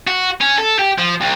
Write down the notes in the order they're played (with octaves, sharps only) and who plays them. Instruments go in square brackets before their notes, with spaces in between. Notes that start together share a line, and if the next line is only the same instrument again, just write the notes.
[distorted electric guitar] F#4
C#4
A4
G4
F3
C2